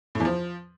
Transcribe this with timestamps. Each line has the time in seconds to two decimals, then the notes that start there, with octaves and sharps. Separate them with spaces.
0.15 A2
0.20 E2
0.25 F3